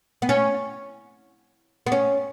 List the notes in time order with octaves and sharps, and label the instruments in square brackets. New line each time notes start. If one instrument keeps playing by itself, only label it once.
[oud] B3
C#4
B3
C#4